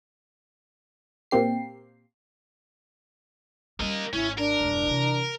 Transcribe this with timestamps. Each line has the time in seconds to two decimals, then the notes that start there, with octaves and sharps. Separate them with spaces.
1.31 A#2 A#3 C4 G4 C7
3.80 G3 A#3 C#4 D#5
4.13 G#1 C#4 E4
4.38 D4 A#4
4.60 E1 G2
4.87 C3 E3